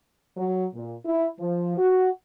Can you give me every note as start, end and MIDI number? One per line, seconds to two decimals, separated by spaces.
0.36 0.65 54
0.74 0.95 46
1.05 1.27 64
1.39 1.76 53
1.78 2.10 66